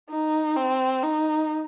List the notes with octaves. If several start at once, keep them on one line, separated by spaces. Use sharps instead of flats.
D#4
C4
D#4